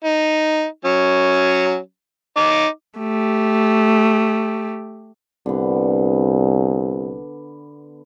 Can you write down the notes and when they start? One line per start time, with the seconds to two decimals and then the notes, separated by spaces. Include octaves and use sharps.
0.05 D#4
0.85 F#3 C#4
2.37 D#4 D6
2.99 A3 G4
5.46 C2 D3 B3